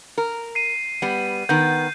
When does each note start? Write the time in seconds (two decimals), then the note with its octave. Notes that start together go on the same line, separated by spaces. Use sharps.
0.18 A#4
0.55 C7 D#7
1.02 G3 B3
1.49 D#3 B3 G6